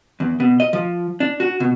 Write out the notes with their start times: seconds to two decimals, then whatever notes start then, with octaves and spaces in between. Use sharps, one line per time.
0.20 E2
0.40 B2
0.60 D#5
0.73 F3
1.20 D4
1.40 F#4
1.60 B2